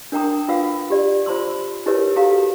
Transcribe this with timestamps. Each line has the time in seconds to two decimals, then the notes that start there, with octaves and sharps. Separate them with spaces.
0.12 D4 A#4 G5 A#5 D#6
0.48 F4 B4 F5 F#5 E6
0.90 G4 D5
1.26 F4 C5 A#5 C6 E6
1.86 D#4 E4 G4 A#4 B4 C#5
2.16 F#4 G4 A4 F5 A#5